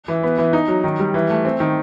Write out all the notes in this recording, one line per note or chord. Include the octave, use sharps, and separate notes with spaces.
E3
B3
E3
D#4
F#3
D#3
G3
E3
A3
C4
D#3